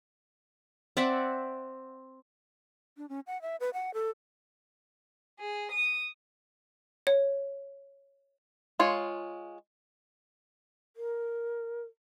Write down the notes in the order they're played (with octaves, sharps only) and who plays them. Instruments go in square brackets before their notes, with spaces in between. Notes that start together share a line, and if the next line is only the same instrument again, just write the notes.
[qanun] C4 D5 E5 F#5
[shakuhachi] D4
C#4
F#5
E5
B4
F#5
A4
[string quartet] G#4
D#6
[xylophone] C#5
[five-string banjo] G#3 F4 C#5
[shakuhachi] A#4